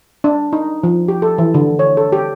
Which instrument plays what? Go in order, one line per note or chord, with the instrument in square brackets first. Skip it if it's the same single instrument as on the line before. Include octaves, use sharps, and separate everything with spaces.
[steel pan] D4
D#4
F3
G4
A4
E3
D3
C#5
A4
G4